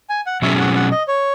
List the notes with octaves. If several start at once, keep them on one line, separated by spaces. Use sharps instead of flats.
G#5
F#5
B2 F#3 C#4 G#4 E5
F#5
F#5
D#5
C#5